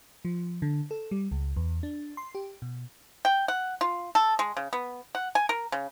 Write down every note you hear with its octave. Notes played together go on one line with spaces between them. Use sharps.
F3
D3
A4
G3
C#2
E2
D4
C6
G4
B2
G5
F#5
F4
A4
G#3
C#3
B3
F#5
G#5
A#4
C#3